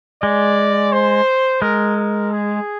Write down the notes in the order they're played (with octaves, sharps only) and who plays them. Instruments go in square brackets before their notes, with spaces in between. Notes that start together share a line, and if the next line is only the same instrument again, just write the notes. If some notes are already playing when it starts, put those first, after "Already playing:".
[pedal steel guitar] G#3 [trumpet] D5
[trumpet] C5
[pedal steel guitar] G#3 [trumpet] A#4
[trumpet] A#4
G#4